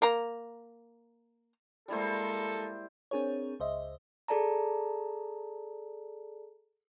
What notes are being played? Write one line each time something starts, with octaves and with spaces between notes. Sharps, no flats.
A#3 A#5
G3 G#3 A#3 E4 A4 C5
C4 D4 G#4 A#4 C#5
C#2 C5 D#5 E5
G#4 A4 D5 A5 A#5